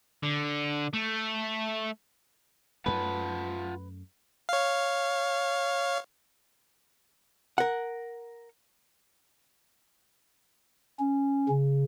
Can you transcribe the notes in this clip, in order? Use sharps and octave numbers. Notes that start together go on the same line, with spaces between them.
D3
A3
F#2 A3 F4 B4 F#5 A5
C#5 F5
A#4 F#5
C#4
C#3